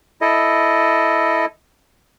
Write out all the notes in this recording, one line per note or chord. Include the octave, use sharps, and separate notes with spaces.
E4 A4 D#5